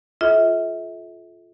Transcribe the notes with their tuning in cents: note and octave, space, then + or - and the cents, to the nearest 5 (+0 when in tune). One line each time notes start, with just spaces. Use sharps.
F4 +0 A4 -35 E5 -35